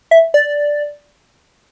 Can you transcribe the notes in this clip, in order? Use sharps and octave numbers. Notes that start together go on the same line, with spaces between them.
E5
D5